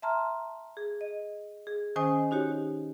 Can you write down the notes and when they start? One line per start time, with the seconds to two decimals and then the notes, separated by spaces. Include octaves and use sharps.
0.02 E5 A5 A#5 C6 F6
0.77 G#4
1.01 D#5
1.67 G#4
1.96 D#3 C#4 C5 D#5 G#5 D#6
2.31 D#4 F#4 G4 C#5